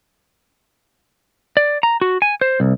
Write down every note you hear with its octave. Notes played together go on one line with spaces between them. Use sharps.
D5
A#5
F#4
G#5
C5
C2